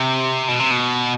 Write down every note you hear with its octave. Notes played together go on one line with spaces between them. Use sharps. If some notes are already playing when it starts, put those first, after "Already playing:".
Already playing: C3
B2
C3
B2